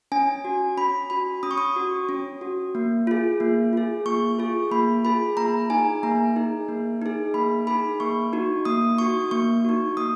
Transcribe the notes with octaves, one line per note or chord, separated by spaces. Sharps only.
C#4 G#5
F#4
C#4 B5
F#4 B5
C#4 D#6
C#6
D#6
F#4
C#4
F#4
A#3
F4 G#4
A#3
F4 G#4
A#3 C#6
F4 G#4
A#3 B5
F4 G#4 B5
A#3 A#5
D#4 G#4 G#5
A#3 A#5
D#4 G#4
A#3
D#4 G#4
A#3 B5
D#4 G#4 B5
A#3 C#6
D#4 F#4
A#3 D#6
D#4 F#4 C#6
A#3 C#6
D#4 F#4
A#3 D#6